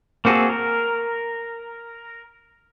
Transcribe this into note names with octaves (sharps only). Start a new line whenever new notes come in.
A#3 C4 F#4 G#4 A4
A#4